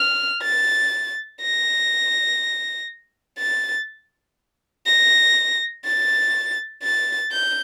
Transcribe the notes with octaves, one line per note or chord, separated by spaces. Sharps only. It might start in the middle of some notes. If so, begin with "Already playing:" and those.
Already playing: F6
A6
A#6
A6
A#6
A6
A6
G6